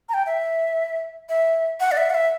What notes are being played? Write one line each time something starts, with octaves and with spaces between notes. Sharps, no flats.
A#5
G5
E5
E5
F#5
D5
E5
F#5
E5